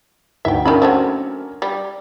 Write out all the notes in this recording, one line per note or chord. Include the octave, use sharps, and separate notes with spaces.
D2 D#4 E5 G5
D#3 C#4 D4 A#4 E5 B5
F#3 A3 C4
G3